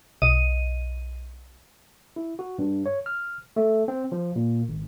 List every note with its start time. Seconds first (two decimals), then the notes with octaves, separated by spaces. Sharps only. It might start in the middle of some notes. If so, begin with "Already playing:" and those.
0.22 B1 D#5 D#7
2.16 E4
2.39 F#4
2.59 G2
2.86 C#5
3.06 F6
3.56 A3
3.88 C4
4.12 F3
4.36 A#2
4.68 G#1